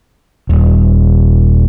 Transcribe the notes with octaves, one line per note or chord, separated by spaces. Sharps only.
D#1